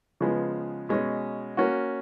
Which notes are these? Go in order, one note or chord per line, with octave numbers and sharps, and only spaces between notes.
C#3 F3 G#3 B3
B2 G#3 C#4
A#3 C#4 F#4